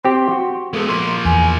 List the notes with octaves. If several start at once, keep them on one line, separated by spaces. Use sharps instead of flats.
C4 G4 C6
F#4
G#3 B3 A4
F3 A#3 C6
E2 G#5